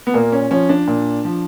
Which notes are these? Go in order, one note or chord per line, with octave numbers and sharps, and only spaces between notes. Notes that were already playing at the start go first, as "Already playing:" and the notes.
B3
A#2 A#3
C#4
F3 C#4
D4
A#2
F3